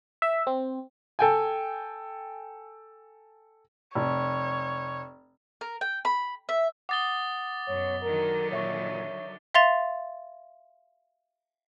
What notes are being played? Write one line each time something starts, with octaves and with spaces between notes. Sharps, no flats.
E5
C4
A4 G5 G#5
F1 C#5
A#4
G5
B5
E5
F#5 D6 D#6 A6 G7
F#2 B2 C#5
D3 D#3 F#3 A#4
A#2 C#5 E5 C#6
E5 F5 C6 A6 F7